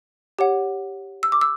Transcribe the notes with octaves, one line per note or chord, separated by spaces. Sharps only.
G4 C#5 F#5
E6
D6
E6